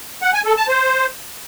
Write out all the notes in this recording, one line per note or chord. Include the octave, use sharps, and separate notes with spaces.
F#5
G#5
A4
A5
C5